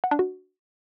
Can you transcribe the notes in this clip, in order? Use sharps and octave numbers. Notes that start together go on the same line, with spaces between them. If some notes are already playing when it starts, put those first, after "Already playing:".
F#5
D4
F#4